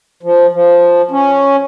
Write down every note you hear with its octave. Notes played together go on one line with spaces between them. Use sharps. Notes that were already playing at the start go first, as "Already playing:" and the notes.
F3
F3
C#4